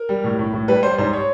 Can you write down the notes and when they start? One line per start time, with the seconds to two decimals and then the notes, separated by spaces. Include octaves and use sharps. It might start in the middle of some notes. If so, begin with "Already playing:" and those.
Already playing: A#4
0.09 G3
0.24 A2
0.39 A2
0.53 A2
0.68 G3 B4
0.83 G3 C5
0.98 G#2 C5
1.13 C#5